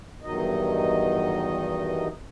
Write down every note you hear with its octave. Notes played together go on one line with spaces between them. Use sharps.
E2 G2 D#3 F#3 D#4 D#5